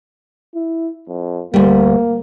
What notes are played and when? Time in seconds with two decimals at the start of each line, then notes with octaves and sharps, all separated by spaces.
0.55 E4
1.08 F2
1.54 D2 G3 A#3